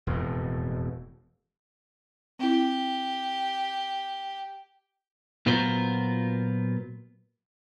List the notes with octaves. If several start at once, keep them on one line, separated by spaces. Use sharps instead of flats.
E1 F2 A2
C4 E4 G4
A#2 F#3 B3 F4 A#4 C5